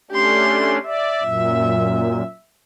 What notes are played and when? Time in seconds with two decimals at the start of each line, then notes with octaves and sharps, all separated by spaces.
0.11 A3 C#4 D4 G4 C6
0.86 D5 E5
1.23 F#2 A#2